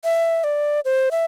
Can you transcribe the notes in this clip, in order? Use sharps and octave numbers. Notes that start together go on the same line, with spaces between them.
E5
D5
C5
E5